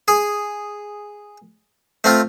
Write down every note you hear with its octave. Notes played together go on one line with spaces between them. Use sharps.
G#4
A3 C4 F4